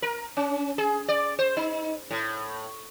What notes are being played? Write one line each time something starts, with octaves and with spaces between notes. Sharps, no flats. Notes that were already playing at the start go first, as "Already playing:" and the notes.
A#4
C#4
G#4
D5
C5
D#4
A2